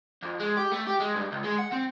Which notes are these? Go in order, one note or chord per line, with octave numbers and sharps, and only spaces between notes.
F2
G#3
G4
A3
G4
G#3
G2
C#2
G#3
F#5
C4